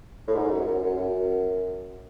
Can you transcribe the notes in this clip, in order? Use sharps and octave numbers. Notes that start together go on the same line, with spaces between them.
A2
G#2
F#2
F#2
F#2
F#2